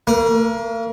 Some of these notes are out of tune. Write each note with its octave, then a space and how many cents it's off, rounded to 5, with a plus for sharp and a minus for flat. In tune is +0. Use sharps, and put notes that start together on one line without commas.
A#3 -40 A#4 +35